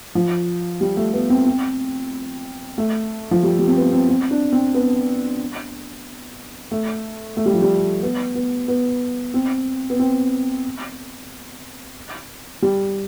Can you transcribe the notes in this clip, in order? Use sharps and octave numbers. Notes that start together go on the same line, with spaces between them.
F3
G3
A3
B3
C4
C4
A3
F3
G3
G3
C4
B3
C4
C4
D4
C4
B3
A3
A3
G3
F3
G3
B3
B3
B3
C4
B3
C4
G3